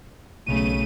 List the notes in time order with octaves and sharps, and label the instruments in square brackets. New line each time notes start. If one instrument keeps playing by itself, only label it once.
[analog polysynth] B1 D#7 [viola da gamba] C#3 A3